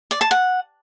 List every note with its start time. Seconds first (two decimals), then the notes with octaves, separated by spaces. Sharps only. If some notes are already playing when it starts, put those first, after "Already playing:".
0.11 D5
0.21 A5
0.31 F#5